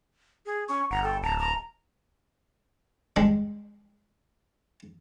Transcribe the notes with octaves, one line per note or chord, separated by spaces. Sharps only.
G#4
C#4 C#6
G1 F#5 A#5
A4 G5
D1 A5 A#5
A#5
G3 G#3 D4